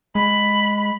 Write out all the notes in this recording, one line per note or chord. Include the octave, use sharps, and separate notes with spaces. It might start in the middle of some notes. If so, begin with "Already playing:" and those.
G#3 B5